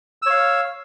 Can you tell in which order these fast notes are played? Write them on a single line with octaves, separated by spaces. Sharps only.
E6 C#5 F5